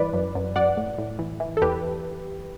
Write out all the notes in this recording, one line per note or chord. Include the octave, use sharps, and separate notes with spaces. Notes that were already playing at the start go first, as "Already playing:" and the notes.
Already playing: G2 E3 B4 D5
F#2
F#2
F#2 D5 F#5
A2
A2
E3
E3
A4
E2 G4 B4